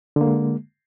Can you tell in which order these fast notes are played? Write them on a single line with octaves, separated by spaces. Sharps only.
D3 A#3 G#3